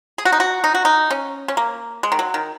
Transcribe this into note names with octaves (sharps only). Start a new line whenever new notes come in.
G#4
F#4
D#4
F#4
D#4
F#4
D#4
C#4
C#4
A#3
G#3
D#3
F#3
D#3